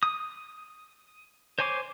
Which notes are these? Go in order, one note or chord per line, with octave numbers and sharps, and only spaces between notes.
D#6
C5 C#5 G#5 C6 D6